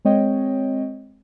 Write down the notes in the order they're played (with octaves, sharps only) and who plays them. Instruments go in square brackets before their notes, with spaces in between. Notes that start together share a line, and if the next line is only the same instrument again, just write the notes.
[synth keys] G#3 C4 C#5 D#5 G5